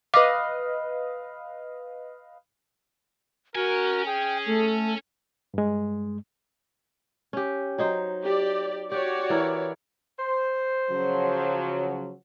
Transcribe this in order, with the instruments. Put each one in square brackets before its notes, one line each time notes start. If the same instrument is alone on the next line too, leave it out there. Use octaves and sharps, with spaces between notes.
[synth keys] B4 D#5 F5 [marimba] D6
[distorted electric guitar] C#4 G#5 [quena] F#4 [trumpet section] A#4
[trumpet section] G#4 [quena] G5
[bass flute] A3 [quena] A4
[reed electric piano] G2 G#3
[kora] C#4 G4
F#3 D#4 C5
[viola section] G4 D5
[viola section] F#4 C#5 D5 [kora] G4
[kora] E3 E4 A#4
[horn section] C5
[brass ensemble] C#3 F3 F#3